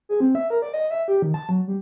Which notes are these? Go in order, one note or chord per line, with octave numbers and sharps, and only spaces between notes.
G#4
C4
E5
A#4
D5
D#5
E5
G4
D#3
A5
F#3
G3